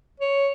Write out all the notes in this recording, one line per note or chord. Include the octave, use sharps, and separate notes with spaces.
C#5